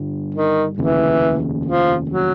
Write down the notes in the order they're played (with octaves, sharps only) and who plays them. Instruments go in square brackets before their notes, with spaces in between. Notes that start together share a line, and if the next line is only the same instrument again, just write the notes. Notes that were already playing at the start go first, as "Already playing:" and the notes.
Already playing: [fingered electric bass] G2 D3 G3
[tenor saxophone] D#3
[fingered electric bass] F1 D#2 C#3 [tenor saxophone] E3
[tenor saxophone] F3
F#3